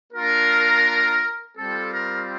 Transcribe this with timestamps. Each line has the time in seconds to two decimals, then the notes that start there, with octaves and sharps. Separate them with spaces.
0.11 A#3 D4 F4 A#4
1.55 G3 C4 F4 A4
1.91 A#4